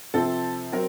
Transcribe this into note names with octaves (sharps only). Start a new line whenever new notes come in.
C3 F3 C4 A4
F#3 C4 A#4